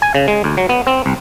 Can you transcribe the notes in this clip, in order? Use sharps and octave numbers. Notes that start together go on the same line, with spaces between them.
G#5
C#3
G#3
D2
F#3
B3
C4
C2